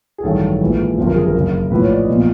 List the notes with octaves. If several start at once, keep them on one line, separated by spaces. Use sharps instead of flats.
G#4
A1 G2 D#3 F#3 A4
A#1 G#2 E3
G#1 F#2 D3 F3 C5
A#4
G#4
A#4
F#1 F#2 C#3
A#1 A2 F3 B4
C#5
D5
D#5
B1 A#2 F3